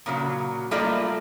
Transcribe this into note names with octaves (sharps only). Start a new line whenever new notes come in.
A#2 C#3 F#3
G3 A3 A#3 F4 D5 D#5